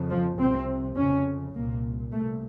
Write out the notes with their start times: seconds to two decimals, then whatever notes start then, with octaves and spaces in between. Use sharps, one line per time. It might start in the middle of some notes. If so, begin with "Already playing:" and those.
Already playing: F2 C#3
0.09 F3
0.38 C2 C3 C4
0.96 F2 C#3 C#4
1.54 C2 A#2 A#3
2.12 C2 A3
2.18 A#2